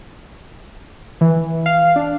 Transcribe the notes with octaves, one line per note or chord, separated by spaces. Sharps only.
E3
F5
D4